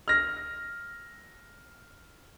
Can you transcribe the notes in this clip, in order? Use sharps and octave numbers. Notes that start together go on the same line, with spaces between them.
F6 A#6